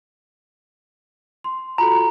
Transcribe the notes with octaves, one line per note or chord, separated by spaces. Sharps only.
C6
F4 F#4 A4 A#5 B5